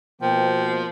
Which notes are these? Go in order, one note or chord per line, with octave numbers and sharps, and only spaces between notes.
B2 F3 A#3 C5 G5